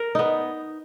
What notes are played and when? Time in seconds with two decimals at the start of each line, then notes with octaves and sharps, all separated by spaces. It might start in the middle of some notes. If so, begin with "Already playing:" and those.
Already playing: A#4
0.15 B3 D#4